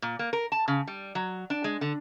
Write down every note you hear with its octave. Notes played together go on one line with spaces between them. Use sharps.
A#2
A#3
A#4
A5
C#3
G3
F#3
D4
G#3
D3